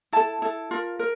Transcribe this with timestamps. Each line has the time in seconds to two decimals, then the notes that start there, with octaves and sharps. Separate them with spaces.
0.13 E4 A4 A5
0.42 E4 A4
0.71 F4 A#4
0.99 A#4